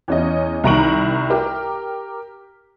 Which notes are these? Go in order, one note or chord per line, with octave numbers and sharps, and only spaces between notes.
E2 C#4 D#5
C2 D#3 A#5 C#6 D7 F#7
G4 A#4